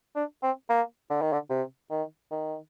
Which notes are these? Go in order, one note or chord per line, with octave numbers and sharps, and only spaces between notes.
D4
C4
A#3
D3
D#3
D3
C3
D#3
D#3